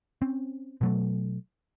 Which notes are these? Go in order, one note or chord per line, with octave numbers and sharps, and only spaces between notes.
C4 C#4
B2 F#3 A3